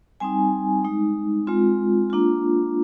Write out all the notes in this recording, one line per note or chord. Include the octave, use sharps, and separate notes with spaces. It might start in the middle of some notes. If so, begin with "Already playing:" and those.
G3 C4 D#4 G#5
G#3 D#4
G#3 C4 F4
A#3 D4 F4